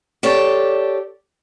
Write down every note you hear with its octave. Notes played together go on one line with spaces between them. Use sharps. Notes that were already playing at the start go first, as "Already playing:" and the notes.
G4 A4 C#5 D5